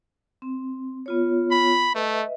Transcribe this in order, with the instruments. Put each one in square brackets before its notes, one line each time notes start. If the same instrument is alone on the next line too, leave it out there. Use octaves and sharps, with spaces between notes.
[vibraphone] C4
B3 F4 C#5
[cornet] B5
[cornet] A3 [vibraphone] B4 D#5 E5